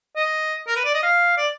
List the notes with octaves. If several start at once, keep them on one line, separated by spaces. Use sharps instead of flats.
D#5
A#4
B4
D5
D#5
F5
D5